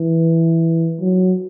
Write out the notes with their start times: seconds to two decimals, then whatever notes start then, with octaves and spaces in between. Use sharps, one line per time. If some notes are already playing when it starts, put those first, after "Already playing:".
Already playing: E3
1.00 F#3